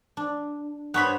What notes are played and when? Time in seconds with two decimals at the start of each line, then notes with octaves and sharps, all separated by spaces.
0.17 D4
0.94 G2 B3 C5 C#5 B5